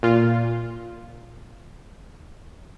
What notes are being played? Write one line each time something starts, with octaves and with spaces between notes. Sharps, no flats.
A#2 F4